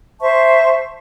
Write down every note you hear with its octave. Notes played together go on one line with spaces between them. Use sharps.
C5 E5 A5 C#6